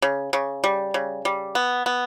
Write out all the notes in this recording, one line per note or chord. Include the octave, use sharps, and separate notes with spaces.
C#3
C#3
G3
C#3
G3
B3
B3